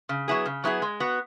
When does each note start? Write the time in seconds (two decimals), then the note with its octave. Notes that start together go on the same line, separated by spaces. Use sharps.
0.09 C#3
0.28 F#3 B3 E4 G#4
0.46 C#3
0.64 F#3 B3 E4 G#4
0.82 G#3
1.00 B3 F#4